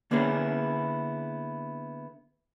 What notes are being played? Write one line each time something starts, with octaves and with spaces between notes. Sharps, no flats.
D3 A#3 B3 C#4 E4 G#4